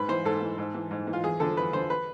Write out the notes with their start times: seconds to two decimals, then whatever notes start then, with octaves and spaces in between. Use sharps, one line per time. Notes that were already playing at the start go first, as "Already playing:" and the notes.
Already playing: G#2 B4
0.08 E3 C5
0.25 G#2 A4
0.41 E3
0.58 G#2
0.74 E3
0.91 G#2
1.07 E3
1.13 F4
1.23 E2 G#4
1.40 D3 F3 A4
1.57 E2 B4
1.73 D3 F3 C5
1.90 B4